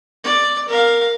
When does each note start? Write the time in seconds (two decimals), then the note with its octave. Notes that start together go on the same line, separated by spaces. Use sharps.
0.24 D5
0.68 A#4 F5